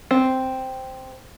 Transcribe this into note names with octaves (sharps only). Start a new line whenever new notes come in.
C4